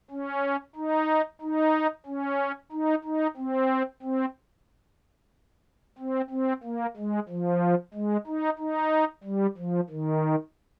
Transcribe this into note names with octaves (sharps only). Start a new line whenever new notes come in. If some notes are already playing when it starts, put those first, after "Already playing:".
C#4
D#4
D#4
C#4
D#4
D#4
C4
C4
C4
C4
A#3
G#3
F3
G#3
D#4
D#4
G3
F3
D#3